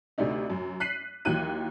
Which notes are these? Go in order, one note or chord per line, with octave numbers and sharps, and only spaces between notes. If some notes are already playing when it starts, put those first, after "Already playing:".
D2 C3 A3 D4 D#4
F#2
F#6 B6 C7 D#7 F#7
D#2 D#3 E3 F#3 F#6 D#7